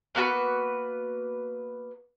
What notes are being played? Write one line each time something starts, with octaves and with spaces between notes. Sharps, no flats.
A#3 B3 F#4 B4